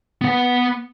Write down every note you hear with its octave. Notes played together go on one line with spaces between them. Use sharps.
B3 F#5